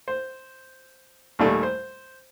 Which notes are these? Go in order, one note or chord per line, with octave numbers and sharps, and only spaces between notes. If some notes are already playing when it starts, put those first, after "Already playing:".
C5
D#2 A#2 G3 A3
C5